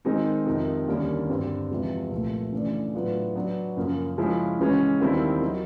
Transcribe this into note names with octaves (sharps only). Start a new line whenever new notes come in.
D#3 G#3 C4 D#4
F2 C3 D#3
D#2 D3 G3 A#3 C#4
G2 D3 G3 C4
E2 C3 F3 G#3 B3
C2 A#2 F3 A3
C#3 E3 A3 D4
A2 F#3 B3 D4 F4
F#3 B3 D4 F#4
F#2 C#3 F3 A#3
C#3 F3 G#3 C#4 E4
C#3 E3 G#3 C#4
D#2 D#3 G3 C4 E4
D#3 F#3